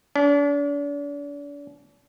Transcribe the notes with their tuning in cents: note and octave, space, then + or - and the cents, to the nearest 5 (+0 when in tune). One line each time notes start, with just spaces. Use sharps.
D4 -40